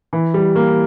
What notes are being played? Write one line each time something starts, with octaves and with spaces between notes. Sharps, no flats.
E3
G3
A#3